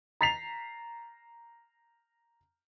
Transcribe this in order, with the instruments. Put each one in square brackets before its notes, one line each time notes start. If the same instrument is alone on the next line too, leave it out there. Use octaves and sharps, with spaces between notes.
[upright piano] A#5 A6 B6 C7 F7